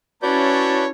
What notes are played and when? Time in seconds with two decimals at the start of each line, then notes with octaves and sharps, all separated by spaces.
0.22 C#4 E4 F#4 B4 C#5 D5 A5 G6